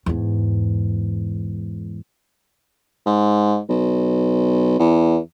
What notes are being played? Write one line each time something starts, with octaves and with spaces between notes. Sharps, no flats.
E2 G#2
G#2
B1
E2